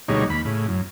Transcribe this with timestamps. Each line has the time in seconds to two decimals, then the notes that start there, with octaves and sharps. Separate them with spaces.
0.08 D2 B2 G3 G#3 D#4 C#5
0.30 D#2 B5
0.45 A2 C#3
0.69 F#2